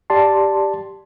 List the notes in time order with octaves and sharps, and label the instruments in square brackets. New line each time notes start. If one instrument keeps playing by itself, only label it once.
[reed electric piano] G4 D5 A5 C6